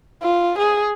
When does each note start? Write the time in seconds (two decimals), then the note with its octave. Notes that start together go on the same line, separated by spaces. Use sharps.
0.23 F4
0.59 G#4